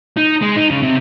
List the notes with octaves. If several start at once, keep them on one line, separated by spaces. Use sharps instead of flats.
D#4
G#3
D#4
C#3
C3